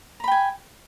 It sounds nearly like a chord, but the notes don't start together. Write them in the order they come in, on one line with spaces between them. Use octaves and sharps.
A#5 B5 G5 G#5